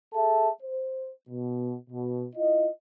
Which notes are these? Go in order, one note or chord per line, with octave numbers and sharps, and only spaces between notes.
G#4 A4 E5 A5
C5
B2
B2
E4 F4 D#5